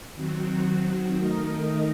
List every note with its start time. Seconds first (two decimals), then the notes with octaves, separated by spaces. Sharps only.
0.15 D#3 F#3 C4 F#4
1.16 D#3 A3 D#4 A#4 D#5